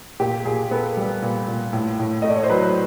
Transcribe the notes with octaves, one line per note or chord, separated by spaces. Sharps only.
A#2 G4
A#2 G#4
B3 A4
G3
A#2
A#2
A2
A2
A3 D#5
D5
C#5
C5
F#3 B4